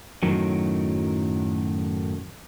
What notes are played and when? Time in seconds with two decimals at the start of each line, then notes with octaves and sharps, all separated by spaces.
0.23 F#2 A2 D#3 F#3